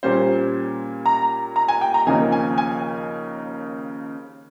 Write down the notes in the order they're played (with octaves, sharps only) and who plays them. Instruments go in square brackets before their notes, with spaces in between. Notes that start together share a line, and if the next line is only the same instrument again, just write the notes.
[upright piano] A#2 G3 A#3 C#4 C5
A#5
A#5
G#5
G5
A#5
D#2 C#3 F3 A#3 D#4 G#5
G#5
G#5